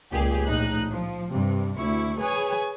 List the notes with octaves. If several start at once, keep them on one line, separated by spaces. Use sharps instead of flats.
C#2 A#2 G4 G#4
A#1 A2 D#4 F#6
F3
G2 C3
D2 E4 C#6
G#4 B4 C#5 G#5